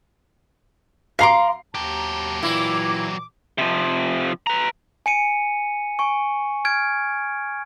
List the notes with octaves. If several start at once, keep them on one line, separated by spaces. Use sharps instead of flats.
F5 A#5 C6 D6 C7
D#2 F#3 G4 A5 A#5
A#2 E3 A#3 E4 D6
C3 F3
B4 A#5
G#5 C#7 D#7
G#5 C#6
F6 G#6 D7